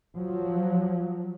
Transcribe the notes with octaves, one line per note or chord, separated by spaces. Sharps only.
F3 F#3